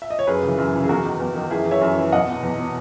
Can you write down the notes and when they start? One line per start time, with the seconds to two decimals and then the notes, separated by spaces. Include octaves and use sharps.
0.02 E5
0.10 D#5
0.19 C#5
0.27 F#2 G#4 B4
0.43 C#3 E3
0.58 F#2
0.74 C#3 E3
0.84 G#4
0.89 E2 F#4 A#4
1.04 D#3
1.20 E2
1.36 D#3
1.50 F#2 E4 G#4
1.66 E3
1.71 C#5 E5
1.81 F#2
1.98 E3
2.12 E2 D#5 F#5
2.28 B2
2.43 E2
2.59 B2